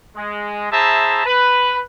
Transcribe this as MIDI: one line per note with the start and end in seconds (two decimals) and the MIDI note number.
0.16 0.68 56
0.72 1.26 64
0.72 1.26 68
0.72 1.26 72
0.72 1.26 76
0.72 1.26 81
0.72 1.26 82
1.26 1.82 71